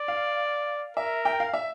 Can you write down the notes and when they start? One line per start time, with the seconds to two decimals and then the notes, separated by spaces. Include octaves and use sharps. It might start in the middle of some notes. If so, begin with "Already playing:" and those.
Already playing: D5
0.08 F5
0.97 A#4 E5
1.25 G5
1.40 F5
1.53 E5